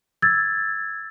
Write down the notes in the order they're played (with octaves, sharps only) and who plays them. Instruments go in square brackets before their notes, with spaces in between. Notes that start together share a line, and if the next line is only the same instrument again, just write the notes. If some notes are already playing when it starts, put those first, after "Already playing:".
[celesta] E6 G#6 A6